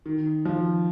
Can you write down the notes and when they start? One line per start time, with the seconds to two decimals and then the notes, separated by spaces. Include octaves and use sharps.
0.06 D#3
0.45 F3